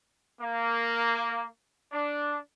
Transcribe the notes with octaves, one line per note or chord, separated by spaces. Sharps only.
A#3
D4